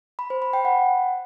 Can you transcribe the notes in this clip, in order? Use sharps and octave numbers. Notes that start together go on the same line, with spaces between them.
B5
C5
B5
G5
F#5